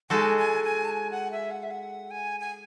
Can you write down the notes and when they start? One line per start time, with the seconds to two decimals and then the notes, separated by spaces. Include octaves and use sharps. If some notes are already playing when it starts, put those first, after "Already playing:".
0.10 G#3 D#4 F#4 A4 G#5
0.37 G#5
0.64 G#5
0.85 A5
0.91 G#5
1.11 F#5
1.31 E5
1.51 F#5
1.63 E5
1.71 F#5
2.11 G#5
2.40 G#5